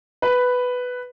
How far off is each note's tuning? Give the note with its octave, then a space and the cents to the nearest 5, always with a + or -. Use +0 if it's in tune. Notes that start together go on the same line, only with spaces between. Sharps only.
B4 +5